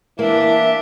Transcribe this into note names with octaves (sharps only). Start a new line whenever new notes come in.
E3 A#3 D4 E5